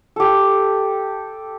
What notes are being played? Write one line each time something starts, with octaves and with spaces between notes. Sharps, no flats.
G4 A4